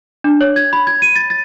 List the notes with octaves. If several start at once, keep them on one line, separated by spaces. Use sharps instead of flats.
D4
C#5
G#6
B5
G#6
D#7
A6
A6